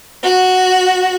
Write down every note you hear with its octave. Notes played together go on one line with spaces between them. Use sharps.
F#4